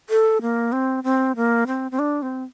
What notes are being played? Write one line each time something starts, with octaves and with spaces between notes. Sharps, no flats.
A4
A#3
C4
C4
A#3
C4
C4
D4
C4